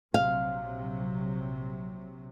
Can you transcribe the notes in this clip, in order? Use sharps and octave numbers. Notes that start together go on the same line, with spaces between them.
A#1 C3 F#3 F5